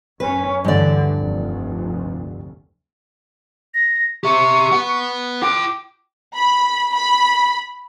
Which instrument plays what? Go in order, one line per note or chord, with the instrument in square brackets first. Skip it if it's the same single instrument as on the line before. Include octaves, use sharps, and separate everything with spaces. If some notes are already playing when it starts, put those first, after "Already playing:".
[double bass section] F#2 C#4 [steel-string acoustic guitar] B4
[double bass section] D2 D3 E3 [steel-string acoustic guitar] G2 D5
[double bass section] F1 D2
[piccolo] A#6
[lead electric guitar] G4 E5 [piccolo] C#6
[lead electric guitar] B4 F#5
[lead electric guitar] F4 G5 [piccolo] D6
[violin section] B5
B5